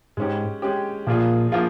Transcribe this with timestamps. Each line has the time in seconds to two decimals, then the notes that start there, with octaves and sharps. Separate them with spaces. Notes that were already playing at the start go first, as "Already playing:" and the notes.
0.17 G#2 G#3 C#4 G4
0.62 G#3 C#4 G4
1.07 A#2 F3 A#3 F4 G#4
1.52 F3 A#3 F4 G#4